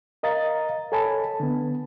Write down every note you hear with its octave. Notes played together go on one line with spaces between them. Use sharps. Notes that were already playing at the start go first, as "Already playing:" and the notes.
A#4 D#5 F5 A#5 A6
A4 C#5 G#5 A5 B5
D3 B3